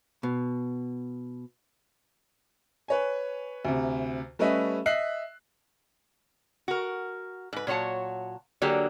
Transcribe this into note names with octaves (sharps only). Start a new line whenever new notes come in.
B2
B4 C#5 G#5
D2 C3
G3 A3 C#4 B4 D#5 E5
D#5 E5 F#6 C7 F#7
F#4 A#4
G#2 B4
A#2 F#3 C#5 F#5 A5
D3 F#3 A#3 G4 G#4